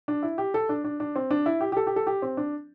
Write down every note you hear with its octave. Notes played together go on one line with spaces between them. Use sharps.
D4
E4
G4
A4
D4
D4
D4
C4
D4
E4
G4
G4
A4
G4
A4
G4
C4
D4